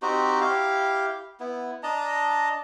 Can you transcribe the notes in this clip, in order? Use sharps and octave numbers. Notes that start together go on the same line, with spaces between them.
C4 D#4 F#4 G4
E4 G4 F5
B3 E4
D4 D#5 A5 A#5